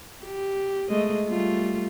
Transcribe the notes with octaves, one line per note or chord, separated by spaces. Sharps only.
G4
G#3 A3 D#5
G3 A3 F4